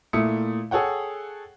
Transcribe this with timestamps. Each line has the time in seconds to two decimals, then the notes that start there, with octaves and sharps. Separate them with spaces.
0.13 A#2 A3 E4 D#6 C#7
0.71 G#4 A4 C#5 F#5 G5